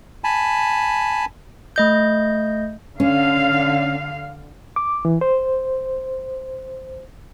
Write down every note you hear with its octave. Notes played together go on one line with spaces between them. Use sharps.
G#5 A5 B5
A3 D#5 G6
D3 C#4 F5
D6
E3
C5